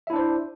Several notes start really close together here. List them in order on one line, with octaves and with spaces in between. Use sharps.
E5 E4 D4 C5